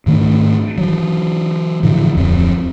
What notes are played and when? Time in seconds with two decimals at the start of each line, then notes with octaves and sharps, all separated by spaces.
0.06 G#2 D#3 A3 D4
0.78 E3 F#3
1.83 A2 D3 E3 F3
2.15 D1 F2 C4